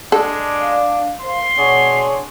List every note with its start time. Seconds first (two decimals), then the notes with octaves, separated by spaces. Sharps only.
0.12 G#3 D4 A4
0.56 D5 F5
1.20 A#4 C5 F5 C6
1.57 B2 D4 G#4 C#5 F#5